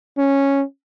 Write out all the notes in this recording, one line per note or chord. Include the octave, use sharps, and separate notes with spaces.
C#4